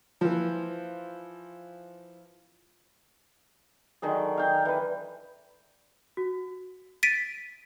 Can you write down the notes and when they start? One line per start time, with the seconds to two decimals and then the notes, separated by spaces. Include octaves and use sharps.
0.21 E3 F3
4.02 D3 D#3 F#3 G#4
4.37 F5 G5 A#5
4.65 E3 B4
6.17 F#4
7.03 A6 B6 D7 D#7